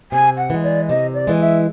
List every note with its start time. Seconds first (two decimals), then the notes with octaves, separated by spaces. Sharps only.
0.12 C3 G#5
0.38 F#5
0.50 E3 G#3
0.63 D5
0.89 C3 D#5
1.14 D5
1.27 E3 G#3
1.41 E5